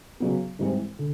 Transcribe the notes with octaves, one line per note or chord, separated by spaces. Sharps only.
C#3 F#3 B3
G#2 E3 G3 C4
D3